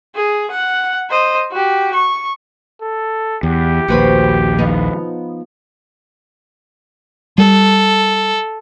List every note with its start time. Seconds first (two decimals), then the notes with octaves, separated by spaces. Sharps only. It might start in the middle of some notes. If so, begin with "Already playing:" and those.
0.16 G#4
0.50 F#5
1.09 C5 D#5
1.51 F#4 G4
1.94 C#6
2.82 A4
3.43 E2 G4
3.88 A#1 D#2 F#4 B4 C5
4.59 F3 B3 D#4
7.38 G3 A4